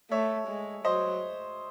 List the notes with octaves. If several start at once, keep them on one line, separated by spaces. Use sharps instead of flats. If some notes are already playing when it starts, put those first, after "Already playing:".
A3 C#5 E5
G#3
F#3 C5 D#5